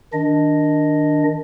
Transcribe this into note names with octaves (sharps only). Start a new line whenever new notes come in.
D#3 D4 D#5